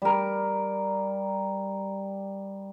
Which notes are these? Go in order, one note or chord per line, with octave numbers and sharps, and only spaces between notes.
G3 A#4